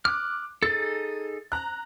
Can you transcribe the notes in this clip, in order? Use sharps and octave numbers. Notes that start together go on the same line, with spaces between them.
D6 F6 F#6
D#4 G#4 A4 A6
A#5 F#6